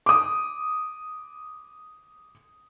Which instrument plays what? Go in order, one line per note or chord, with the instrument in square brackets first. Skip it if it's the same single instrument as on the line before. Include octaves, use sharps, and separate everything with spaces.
[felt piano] D6 D#6